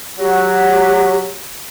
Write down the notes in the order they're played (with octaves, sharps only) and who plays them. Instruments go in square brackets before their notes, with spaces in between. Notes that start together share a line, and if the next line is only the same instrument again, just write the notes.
[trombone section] F#3 [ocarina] G4